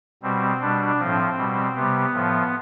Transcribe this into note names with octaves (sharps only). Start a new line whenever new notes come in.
B2 G3 C4
B2 G3 D4
A2 F3 C4
B2 G3
C3 G3 B3
A2 F3